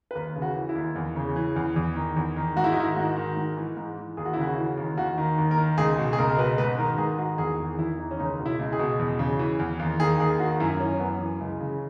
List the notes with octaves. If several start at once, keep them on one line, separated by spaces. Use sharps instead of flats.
B4
D#2 A#4
C#3
F#4
E3
E4
D#2
E2
C#3
E3
E2
E2
D#3
E2
D#3
G#2 F#4
E4
D#4
D#3 E4
G#2 F#4
D#3
G#2
E3
G#2
E3
D#2 G#4
F#4
E4
C#3 F#4
E3
D#2
D#2 F#4
D#3
D#2
A#4
D#3
C#2 G#4
B2
G#4
C#2 A#4
A#4
B2 B4
G#2 B4
D#3 A#4
G#2 G#4
D#3 F#4
E2 G#4
D#3
E2 E4
D#3
C#4
C#2 D#4
B2
E4
C#2
G#4
B2
E2
C#3
E3
E2
D#2
D#3 G#4
D#2 G#4
D#3 F#4
F#2 E4
E3 C#4
F#2 B3
E3
C#2
C#3